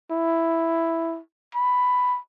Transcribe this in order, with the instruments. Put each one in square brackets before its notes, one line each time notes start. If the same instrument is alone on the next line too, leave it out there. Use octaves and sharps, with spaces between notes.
[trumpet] E4
B5